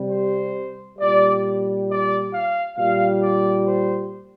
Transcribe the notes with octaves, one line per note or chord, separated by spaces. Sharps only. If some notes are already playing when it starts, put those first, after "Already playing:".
Already playing: C3 G3
C5
A#2 G3 D5
D5
F5
A#2 G3 F5
D5
C5